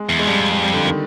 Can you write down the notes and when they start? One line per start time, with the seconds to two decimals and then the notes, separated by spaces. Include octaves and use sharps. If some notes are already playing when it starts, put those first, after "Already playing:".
Already playing: G#3
0.09 E2
0.19 G#3
0.27 F2 G3
0.51 G#3
0.62 G3
0.73 D3
0.85 D#3